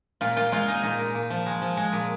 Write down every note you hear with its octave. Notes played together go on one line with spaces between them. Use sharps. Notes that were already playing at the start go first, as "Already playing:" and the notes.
A#2 F4
A#2 F4
G#3 F4
G#3 D#4
A#2 D#4
A#2
A#2
F3
G#3
F3
G#3
A#2